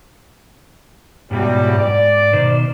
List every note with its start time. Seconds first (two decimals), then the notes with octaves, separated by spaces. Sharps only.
1.31 E2 G#2 B2 F#3 G3 F#4
1.78 G#2 D5
2.33 B2 D#3 C5